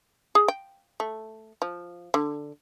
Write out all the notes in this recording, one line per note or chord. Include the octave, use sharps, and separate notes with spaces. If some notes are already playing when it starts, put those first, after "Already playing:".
G#4
G5
A3
F3
D3